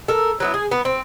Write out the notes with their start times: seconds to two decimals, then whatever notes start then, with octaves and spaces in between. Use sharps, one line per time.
0.08 A4 A#4
0.40 F#3 B3 E4
0.54 G#4
0.71 B3
0.85 C4